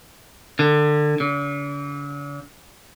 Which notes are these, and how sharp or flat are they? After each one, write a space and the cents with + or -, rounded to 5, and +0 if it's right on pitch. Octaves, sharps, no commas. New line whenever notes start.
D3 +25
D3 -45